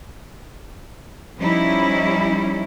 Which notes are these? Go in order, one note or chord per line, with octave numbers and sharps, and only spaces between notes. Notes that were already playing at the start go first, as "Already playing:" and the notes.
F3 G3 C#4 D#4 E4